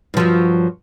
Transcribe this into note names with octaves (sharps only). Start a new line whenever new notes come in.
G2 F3 F#3